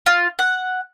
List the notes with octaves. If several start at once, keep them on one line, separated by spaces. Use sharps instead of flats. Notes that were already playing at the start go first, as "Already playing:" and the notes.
F4
F#5